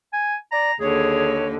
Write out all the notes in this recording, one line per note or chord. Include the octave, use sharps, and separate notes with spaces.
G#5
D5 A#5
D#2 D3 G#4 C#5